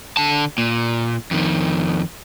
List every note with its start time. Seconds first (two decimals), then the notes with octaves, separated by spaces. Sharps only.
0.17 D3 A5
0.58 A#2
1.31 F2 D#3